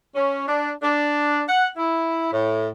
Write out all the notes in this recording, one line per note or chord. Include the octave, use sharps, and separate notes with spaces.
C#4
D4
D4
F#5
E4
A2